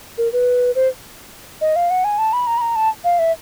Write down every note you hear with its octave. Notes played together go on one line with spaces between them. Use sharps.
A#4
B4
C5
D#5
F5
F#5
G#5
A5
B5
A#5
B5
A#5
A5
F5
E5